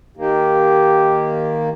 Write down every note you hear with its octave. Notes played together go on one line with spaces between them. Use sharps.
D#3 A#3 G4